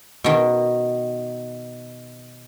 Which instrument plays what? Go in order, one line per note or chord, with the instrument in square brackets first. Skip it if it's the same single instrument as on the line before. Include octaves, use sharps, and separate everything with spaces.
[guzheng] B2 D#3